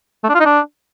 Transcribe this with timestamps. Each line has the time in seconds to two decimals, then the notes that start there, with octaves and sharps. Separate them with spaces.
0.24 A3
0.29 D4
0.35 F4
0.40 D#4
0.46 D4